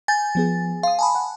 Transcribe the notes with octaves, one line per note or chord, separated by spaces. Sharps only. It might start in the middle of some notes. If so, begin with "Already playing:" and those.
G#5 G6 A6
F3 B3 G#4
F5 C6 D#6
G#5 A5 B5
F#5